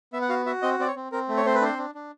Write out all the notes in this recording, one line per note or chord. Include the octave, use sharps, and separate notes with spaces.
B3 E5
F#5
F#4 F5
F#4 E5
C4 D#5
C4 D5
C#5
C4
C4 A#4
A3
C#5
C4 C5
B4
D4 C5
D4
D4